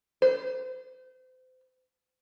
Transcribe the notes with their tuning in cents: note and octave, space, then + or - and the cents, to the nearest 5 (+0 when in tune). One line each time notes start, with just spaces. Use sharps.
C5 -35